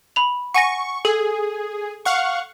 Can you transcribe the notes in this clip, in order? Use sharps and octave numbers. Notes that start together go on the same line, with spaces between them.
B5 F7
F#5 G#5 C#6 A#6
G#4 A4
F5 F#5 C#6